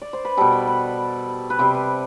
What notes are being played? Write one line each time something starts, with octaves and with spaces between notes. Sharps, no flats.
D5
C5
B4
B2 G3 A4
A4
B4
B4
C3 G3 C5
B4